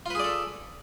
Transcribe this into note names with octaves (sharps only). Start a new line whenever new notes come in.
F4 G#4 A4 B4 D5